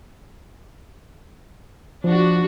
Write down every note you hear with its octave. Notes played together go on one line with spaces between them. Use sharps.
F3 D4 F#4